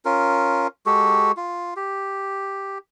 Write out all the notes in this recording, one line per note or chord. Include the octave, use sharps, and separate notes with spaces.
C#4 F4 A#4
G#3 F#4 G4 A4
F4
G4